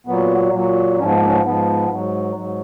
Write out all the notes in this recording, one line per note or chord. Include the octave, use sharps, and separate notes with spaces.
A#2 F#3 B3
A#2 F#3
G#2 F3 C#4
B3
A#3
C#4
B3
G#2 F3 B3
G#2 F#3
G#2 F#3